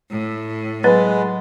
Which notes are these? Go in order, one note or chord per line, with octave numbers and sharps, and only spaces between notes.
A2
F#3 G#3 B4